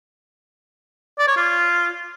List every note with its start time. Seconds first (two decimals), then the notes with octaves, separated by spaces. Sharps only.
1.18 D5
1.27 C#5
1.37 F4